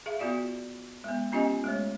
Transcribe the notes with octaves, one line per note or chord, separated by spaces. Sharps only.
G#4 E5 F5
B3 F4 F#4 D5 F5
G#3 B3
B3 C#4 F4 G4 D#5 G#5
G#3 A3 C#5